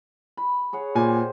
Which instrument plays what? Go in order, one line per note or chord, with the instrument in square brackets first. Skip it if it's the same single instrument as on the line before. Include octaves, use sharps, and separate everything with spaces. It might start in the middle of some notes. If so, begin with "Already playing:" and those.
[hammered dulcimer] B5
G#4 C#5 F#5
[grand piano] A#2 G#5 [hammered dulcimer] G4 C5